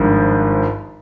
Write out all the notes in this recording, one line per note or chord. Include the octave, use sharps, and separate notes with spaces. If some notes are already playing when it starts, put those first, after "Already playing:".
Already playing: G#1 G2 F3